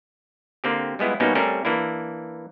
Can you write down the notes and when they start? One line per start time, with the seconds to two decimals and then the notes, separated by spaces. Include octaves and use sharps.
0.64 D3 A#3 C4 G4
0.99 G3 G#3 B3 E4 F4
1.20 B2 G3 A#3 B3 C#4 D#4
1.35 G3 A3 C4 C#4 A#4
1.65 E3 A#3 D4 E4